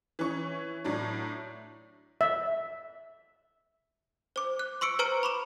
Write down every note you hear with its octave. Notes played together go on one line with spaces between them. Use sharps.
E3 C#4 C#6
A2 F#3 D4 C#5
E5
C5 D6
F#6
C6 C#6 E6 C#7 D7
B4 C5 A#5 F6 C#7 D7
B5 C#6 D6 E7